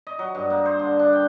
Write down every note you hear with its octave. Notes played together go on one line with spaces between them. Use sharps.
D#5
F#3
G2
A#3
C5
D3
D4
G5